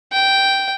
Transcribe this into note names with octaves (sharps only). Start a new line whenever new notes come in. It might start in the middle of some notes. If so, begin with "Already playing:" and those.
G5